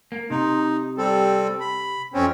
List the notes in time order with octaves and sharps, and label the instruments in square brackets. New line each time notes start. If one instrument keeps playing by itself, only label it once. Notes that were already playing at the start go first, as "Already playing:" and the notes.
[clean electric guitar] A#3
[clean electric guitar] C3 [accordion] D#4
[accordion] G3 C4 A4
B5
F2 C4 C#4